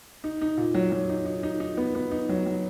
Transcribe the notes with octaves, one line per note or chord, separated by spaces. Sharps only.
D#4
D#4
A#2
F#3
F#3
D#4
D#4
D#4
D#4
B3
B3
D#4
F#3
F#3